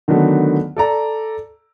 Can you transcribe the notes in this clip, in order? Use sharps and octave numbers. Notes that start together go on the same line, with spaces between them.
D3 D#3 F#3 A3 B3
A4 D5 A#5